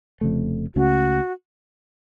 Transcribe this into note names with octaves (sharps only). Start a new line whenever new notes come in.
F1 F2 C#3 A3
C#2 C#3 A3 C#4 F#4